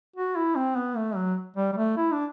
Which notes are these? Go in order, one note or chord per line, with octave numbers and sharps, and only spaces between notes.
F#4
E4
C4
B3
A3
F#3
G3
G3
A3
E4
D4